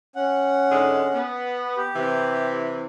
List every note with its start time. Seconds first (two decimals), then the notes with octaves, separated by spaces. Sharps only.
0.16 C#4 F#5
0.70 G#2 D3 G#3
1.14 B3
1.77 G4
1.95 C3 E3